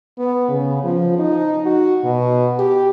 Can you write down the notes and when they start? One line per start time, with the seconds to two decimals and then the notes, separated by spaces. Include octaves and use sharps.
0.18 B3
0.49 C#3
0.83 F3
1.18 D#4
1.66 F#4
2.04 B2
2.59 G4